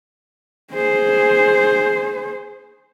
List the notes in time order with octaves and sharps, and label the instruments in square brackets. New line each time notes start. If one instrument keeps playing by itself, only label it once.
[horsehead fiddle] G#4 C5